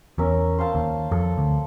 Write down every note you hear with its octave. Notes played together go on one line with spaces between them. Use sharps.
E2 C#4 A#4 E5
C5 F5 A5
D#2
F2 A4
D2